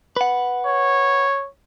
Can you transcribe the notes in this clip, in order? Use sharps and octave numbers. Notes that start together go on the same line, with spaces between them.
B4 F#5
C#5